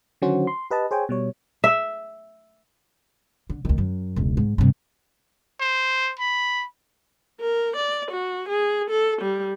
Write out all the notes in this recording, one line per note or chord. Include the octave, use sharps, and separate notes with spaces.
D3 D#3 F#3 C#4 F#4 C5
C6
G4 B4 D#5 A5
G#4 C5 C#5 G5 G#5
B2 G3 C#5
E5
D3
D2 D#3
F#2
E1 C#2
G#2
G2 C3
C5
B5
A#4
D5
F#4
G#4
A4
G3